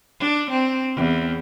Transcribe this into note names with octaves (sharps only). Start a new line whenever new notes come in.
D4
C4
E2